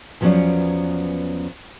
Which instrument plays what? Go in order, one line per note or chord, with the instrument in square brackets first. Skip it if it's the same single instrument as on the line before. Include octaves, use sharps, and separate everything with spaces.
[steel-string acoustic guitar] E2 F3 F#3 B3 C#4 D5